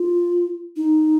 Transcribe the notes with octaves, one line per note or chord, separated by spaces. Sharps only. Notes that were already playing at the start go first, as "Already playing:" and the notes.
Already playing: F4
D#4